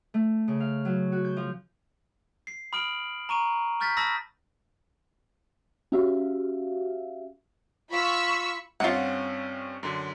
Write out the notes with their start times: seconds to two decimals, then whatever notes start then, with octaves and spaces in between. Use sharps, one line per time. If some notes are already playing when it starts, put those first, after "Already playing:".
0.14 A3
0.48 C#3
0.60 F5
0.85 F#3
1.12 F#4
1.25 G6
1.37 F3
2.47 C7
2.73 B5 D#6 F6 D7 F#7
3.29 A#5 C#6 D#7
3.80 C#6 F6 G6 A6 B6
3.97 A5 B5 D#6 E6 A6 A#6
5.92 C#4 F#4 G4 E5 F5
7.91 F4 B5 C#6 E6
8.80 G2 C4 C#4 F4 F#5
9.83 F#2 D3